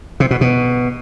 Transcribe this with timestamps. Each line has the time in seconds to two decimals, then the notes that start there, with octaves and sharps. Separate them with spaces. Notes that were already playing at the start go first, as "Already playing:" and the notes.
0.20 C3
0.31 B2
0.41 B2